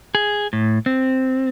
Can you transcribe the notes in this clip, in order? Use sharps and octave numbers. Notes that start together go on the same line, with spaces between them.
G#4
A2
C4